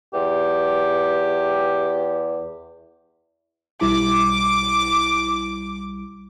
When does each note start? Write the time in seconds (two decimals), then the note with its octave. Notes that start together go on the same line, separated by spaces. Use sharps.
0.14 E2 G4
3.81 B1 G3 E4 D6